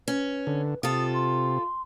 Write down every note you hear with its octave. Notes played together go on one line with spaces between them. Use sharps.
C#4 B4
D3
C3 F4 A4 D#6
C6